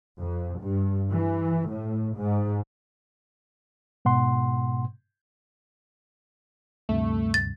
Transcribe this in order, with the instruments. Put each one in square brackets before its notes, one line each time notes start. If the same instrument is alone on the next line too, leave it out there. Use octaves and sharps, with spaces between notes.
[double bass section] F2
G2
E3
A2
G#2
[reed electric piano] G#2 B2 F#5 C6
[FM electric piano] D2 G2 C3 [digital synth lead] A3
[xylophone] A6